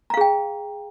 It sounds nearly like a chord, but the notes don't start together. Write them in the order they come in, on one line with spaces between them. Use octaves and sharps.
A#5 F5 G#4 G5